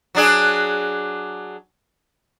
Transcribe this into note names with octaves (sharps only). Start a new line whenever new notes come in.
F#3 D4 G#4